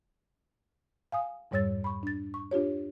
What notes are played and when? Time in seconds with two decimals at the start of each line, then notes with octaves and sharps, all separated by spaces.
1.12 F5 G#5 D#6
1.51 F2 G#2 G3 C#5 E6 A6
1.84 B5 C#6
2.03 D4 A6
2.34 C#6
2.51 D4 F4 G4 C#5